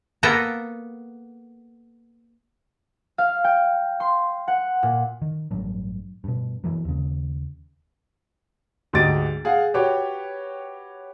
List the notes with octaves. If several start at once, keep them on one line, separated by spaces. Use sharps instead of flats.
A#3 B3 A4 A#5
F5
G5
C6
F#5
A#2
D#3
A1 G2 F#3
G2 B2
F#2 E3 F#3
D#2 C#3
D2 G#2 G4 D#5 A6 D7
G#4 F5 F#5
F#4 G4 B4 C#5 G5